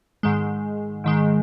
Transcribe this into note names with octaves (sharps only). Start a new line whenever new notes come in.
G#2 D#3 G#3
G#2 D#3 G#3